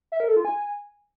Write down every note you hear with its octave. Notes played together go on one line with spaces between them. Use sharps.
E5
A#4
A4
F4
G#5